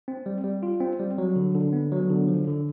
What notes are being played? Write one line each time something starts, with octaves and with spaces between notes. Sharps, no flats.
C4
G3
G3
F4
C4
G3
F#3
D3
D3
B3
F#3
D3
F3
D3